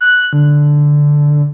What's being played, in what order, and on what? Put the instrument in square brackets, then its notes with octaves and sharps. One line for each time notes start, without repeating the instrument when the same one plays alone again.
[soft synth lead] F#6
D3